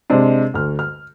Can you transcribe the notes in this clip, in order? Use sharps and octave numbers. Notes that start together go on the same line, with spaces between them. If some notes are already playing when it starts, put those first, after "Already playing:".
C3 G#3 D4
D2 F6
F6